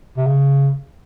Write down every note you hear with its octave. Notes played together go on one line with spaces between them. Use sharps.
C3
C#3